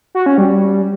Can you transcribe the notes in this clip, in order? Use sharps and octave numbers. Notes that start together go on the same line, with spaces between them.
F#4
C#4
G3